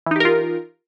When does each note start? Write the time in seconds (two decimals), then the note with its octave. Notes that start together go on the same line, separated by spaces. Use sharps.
0.06 E3
0.11 D#4
0.16 G4
0.20 A#4
0.25 F4